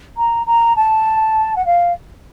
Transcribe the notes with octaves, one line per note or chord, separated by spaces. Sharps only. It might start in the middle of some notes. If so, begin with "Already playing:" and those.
A#5
A#5
A5
F#5
F5